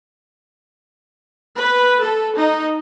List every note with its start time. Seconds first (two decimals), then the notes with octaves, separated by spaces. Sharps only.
1.58 B4
2.03 A4
2.38 D#4